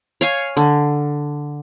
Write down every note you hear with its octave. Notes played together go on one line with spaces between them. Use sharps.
C#5 F5 G#5
D3